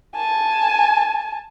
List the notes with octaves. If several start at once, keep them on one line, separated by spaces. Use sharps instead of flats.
G#5 A5